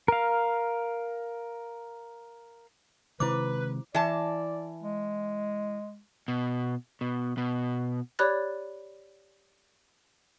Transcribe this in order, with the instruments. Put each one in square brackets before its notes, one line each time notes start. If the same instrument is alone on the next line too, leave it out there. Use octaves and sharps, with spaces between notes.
[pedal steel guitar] A#4 F5
[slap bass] C3 D#3 G#3 [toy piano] E4 C5 D6 [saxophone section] B4
[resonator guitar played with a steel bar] E3 A5 [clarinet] D5
[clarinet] G#3
[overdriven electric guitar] B2
B2
B2
[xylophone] G4 C#5 D5 B5 F#6 A6